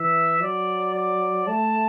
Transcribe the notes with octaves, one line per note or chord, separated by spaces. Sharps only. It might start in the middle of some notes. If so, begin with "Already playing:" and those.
Already playing: E3 E5
F#3 D5
D5
A3 A5